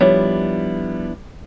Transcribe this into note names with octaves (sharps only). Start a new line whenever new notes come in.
F3 G3 B3 D4 E4 C#5